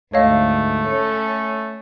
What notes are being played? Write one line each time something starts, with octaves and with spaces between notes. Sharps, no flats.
D2 G#2 A3 C#5 D#5 F5
C#4 A4